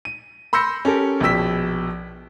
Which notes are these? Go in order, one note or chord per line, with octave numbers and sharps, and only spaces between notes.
D#7
B5 C6 E6 G6 A#6 C#7
C#4 G4 A4 A#4
A#1 B2 G5 E6 B6